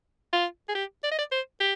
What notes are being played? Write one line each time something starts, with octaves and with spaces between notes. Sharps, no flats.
F4
G#4
G4
D5
D#5
D5
C5
G4